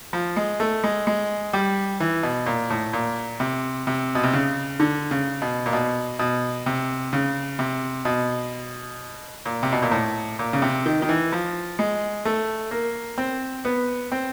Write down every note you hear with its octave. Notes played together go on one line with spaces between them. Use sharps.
F3
G#3
A3
G#3
G#3
G3
E3
B2
A#2
A2
A#2
C3
C3
B2
C3
C#3
D3
C#3
B2
A#2
B2
B2
C3
C#3
C3
B2
A#2
C3
B2
A#2
A2
A#2
C#3
C3
D#3
D#3
E3
F3
G#3
A3
A#3
C4
B3
C4